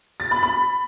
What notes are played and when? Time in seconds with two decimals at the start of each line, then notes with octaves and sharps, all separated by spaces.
0.20 A6
0.31 B5
0.43 B5